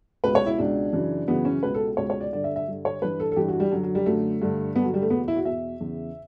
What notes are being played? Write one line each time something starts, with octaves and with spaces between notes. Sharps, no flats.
C#2 B2 B4
C#5
E4
C#2 B2 D4
F#2 C#3 E3
F#2 C#3 E3 B3
C#4
C#2 B2 B4
A4
C#2 B2 C#5
C#5
D5
G2 D3 D5
E5
E5
G2 D3
C#5
G2 E3 B4
A4
A4
G2 E3 G4
F#4
G3
F#2 D3 F#3
F#3
G3
F#2 D3 A3
G2 D3
G2 D3 B3
F#3
G3
A3
E2 B2 B3
E4
F#4
E2 B2 E5
E2 C#3 E3